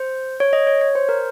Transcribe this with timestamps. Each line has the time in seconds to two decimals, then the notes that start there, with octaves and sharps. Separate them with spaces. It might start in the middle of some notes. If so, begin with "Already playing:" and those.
Already playing: C5
0.40 C#5
0.53 D#5
0.67 C#5
0.81 C#5
0.95 C5
1.09 A#4